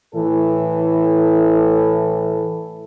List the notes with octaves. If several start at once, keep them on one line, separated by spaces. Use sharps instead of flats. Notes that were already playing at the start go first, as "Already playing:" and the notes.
A2 E3 A4